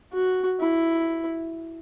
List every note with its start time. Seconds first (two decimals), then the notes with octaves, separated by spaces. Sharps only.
0.13 F#4
0.60 E4